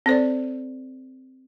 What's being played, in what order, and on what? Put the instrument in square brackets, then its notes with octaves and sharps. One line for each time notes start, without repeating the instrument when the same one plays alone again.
[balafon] C4 A4 C5 D5